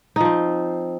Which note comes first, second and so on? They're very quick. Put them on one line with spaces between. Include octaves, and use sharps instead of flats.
D#4 F3 C4